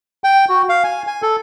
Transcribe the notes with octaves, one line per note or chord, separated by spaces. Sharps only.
G5
F#4
F5
G#5
G#5
A4